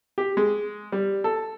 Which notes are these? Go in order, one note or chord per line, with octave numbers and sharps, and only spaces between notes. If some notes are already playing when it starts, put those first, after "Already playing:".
G4
G#3
G3
A4